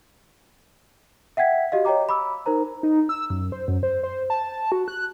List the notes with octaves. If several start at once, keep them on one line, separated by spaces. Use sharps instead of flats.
E5 F#5 G5 G#6 B6
F#4 G4 D#5 F5
C#5 D#5 G5 A#5 D6
B5 D6 E6
D#4 A#4 C5 A#5
D#4
E6
F#2
C5
F#2
C5
C5
A5
A5
F#4
F#6